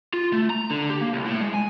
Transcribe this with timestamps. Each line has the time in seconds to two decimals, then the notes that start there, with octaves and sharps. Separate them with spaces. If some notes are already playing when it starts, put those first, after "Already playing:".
0.14 F4
0.33 A3
0.50 A#5
0.71 D3
0.90 G4
1.01 A#3
1.13 C2
1.27 A2
1.42 G#3
1.54 G#5